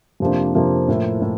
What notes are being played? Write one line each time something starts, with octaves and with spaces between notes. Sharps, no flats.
F2 C3 F3 A#3 D4
F2 C3 F3 A#3 D4
A2 F3 A#3 E4
A2